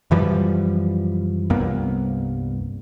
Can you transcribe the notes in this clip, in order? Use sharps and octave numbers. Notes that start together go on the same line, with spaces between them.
F#2 E3 F3 G3
C2 G2 A#3 B3